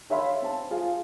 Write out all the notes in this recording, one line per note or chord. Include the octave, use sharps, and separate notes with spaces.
G#4 C#5 E5 F5 B5 C6
C4 A5
F4 G#4 F5